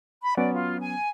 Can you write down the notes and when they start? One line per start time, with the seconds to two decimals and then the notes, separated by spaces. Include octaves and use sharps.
0.22 B5
0.37 F#3 B3 C#4 D5
0.53 F4
0.80 G#5